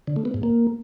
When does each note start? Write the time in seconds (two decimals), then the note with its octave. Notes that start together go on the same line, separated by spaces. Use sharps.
0.07 D3
0.16 A3
0.25 B3
0.34 G#2
0.43 A#3